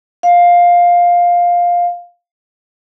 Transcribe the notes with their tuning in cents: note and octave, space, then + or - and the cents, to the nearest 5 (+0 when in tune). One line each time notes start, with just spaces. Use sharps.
F5 +10